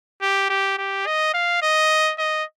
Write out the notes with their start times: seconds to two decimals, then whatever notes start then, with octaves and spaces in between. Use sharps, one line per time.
0.22 G4
0.50 G4
0.78 G4
1.07 D#5
1.34 F5
1.62 D#5
2.18 D#5